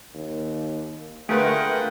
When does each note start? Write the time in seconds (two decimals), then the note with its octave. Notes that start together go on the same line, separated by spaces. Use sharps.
0.14 D#2
1.29 D3 A3 F4 G#4 A#4 B4 F#5 G5